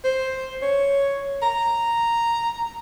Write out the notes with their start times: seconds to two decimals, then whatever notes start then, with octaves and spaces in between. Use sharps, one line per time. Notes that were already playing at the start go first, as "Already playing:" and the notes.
0.04 C5
0.62 C#5
1.42 A#5